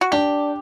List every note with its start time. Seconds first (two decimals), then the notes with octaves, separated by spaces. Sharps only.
0.01 F#4
0.12 D4 G4